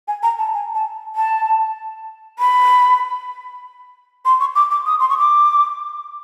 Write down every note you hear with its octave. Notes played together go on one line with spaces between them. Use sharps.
G#5
A#5
A5
G#5
A5
A5
B5
C6
C#6
D6
D6
D#6
C6
C#6
D6